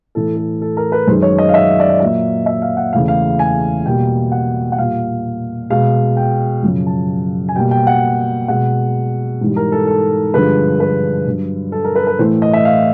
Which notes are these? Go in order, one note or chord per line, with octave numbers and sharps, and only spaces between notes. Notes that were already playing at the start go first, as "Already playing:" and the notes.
A2 E3 A3 A4
A4
A4
A#4
B4
F#2 D#3 G#3 C5
C#5
D#5
F5
E5
D5
D#5
A#2 F#3 A#3 E5
E5
F5
F#5
E2 C#3 E3 A3 F5
F5
G#5
B2 G3 A#3 G5
F#5
F#5
A#2 G3 A#3 F5
B2 G#3 F5
G5
F#2 C#3 F3
A5
G#5
B2 G3 A#3 G5
G5
F#5
B2 G#3 F#5
G#2 E3 G3
A#4
A4
A4
G2 D3 F3 G#3 B4
B4
G2 D3 F#3
A4
A#4
B4
B4
A2 E3 A3 C5
D#5
E5
F5